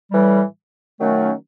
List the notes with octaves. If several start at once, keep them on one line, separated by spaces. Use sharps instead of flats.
A2 E3 G3
D#3 F#3 A3 C#4